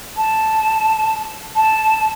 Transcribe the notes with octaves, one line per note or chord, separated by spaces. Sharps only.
A5
A5